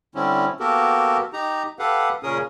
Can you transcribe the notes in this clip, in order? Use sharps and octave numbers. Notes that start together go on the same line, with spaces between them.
D3 G3 C4 C#4 E4
A#3 B3 F#4 G4 A4 A#4
D#4 G4 A#5
G4 A4 B4 F5 F#5
A#2 C#3 C#4 G#4 A#4 D#6